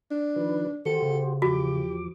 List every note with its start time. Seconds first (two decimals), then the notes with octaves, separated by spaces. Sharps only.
0.11 D4
0.36 D#3 F3 B4
0.86 D#3 F#4 G4 A4 C5
1.02 C#3
1.42 E2 F3 F#4 G4 D6